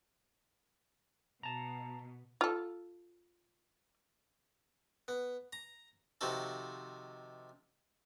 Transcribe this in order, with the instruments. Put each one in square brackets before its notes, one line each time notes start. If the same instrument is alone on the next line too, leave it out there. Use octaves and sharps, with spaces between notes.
[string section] B2 [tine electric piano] A5 A#5
[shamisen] F4 A4
[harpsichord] B3
A#5
C3 D#3 F3 F#4 A4